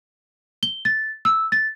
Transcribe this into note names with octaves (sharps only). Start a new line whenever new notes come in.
G7
A6
E6
A6